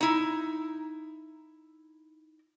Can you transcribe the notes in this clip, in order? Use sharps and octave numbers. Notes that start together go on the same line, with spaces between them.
D#4 E4